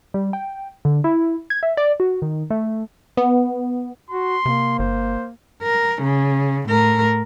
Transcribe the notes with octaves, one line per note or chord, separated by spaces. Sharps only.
G3
G5
D3
E4
G#6
E5
D5
F#4
D#3
A3
B3
F#4 C6
C3 A#3
G1 C5
A#4
C#3
A2 A#4